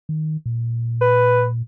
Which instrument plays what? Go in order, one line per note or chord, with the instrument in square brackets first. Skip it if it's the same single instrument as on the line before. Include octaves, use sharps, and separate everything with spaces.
[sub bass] D#3
A#2
[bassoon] B4